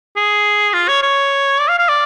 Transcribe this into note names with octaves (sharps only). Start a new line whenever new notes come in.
G#4
F4
C#5
C#5
D5
F5
F5
D5